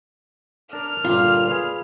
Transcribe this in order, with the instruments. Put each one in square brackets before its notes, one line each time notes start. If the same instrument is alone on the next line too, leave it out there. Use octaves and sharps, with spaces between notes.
[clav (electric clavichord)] D4 A#4 [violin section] F6
[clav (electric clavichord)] G1 A#2 G3 [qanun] F4
[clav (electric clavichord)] G#4 B4 F5